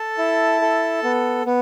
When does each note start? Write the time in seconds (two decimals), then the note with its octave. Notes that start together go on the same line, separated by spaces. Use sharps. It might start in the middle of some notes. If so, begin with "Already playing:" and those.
Already playing: A4 A5
0.18 E4
0.62 A4
1.04 B3
1.46 B3